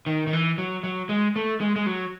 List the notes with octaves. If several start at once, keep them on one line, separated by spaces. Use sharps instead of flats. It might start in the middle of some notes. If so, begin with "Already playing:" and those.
D#3
D#3
E3
F#3
F#3
G#3
A3
G#3
G#3
F#3